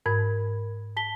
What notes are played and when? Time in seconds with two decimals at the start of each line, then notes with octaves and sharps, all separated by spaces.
0.06 G#2 A#4 B5 G#6
0.96 A5 B6 G7